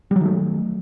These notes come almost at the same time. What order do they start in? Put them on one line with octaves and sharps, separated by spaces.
G3 F#3 D#3 A3